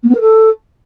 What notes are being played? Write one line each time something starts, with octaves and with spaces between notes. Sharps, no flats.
A#3
B3
A#4
A4